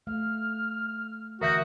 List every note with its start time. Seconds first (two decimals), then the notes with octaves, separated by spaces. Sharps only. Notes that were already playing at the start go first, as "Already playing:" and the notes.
0.07 A3 F5 F6
1.41 D3 E3 F#4 A#4 E5 D#6 G6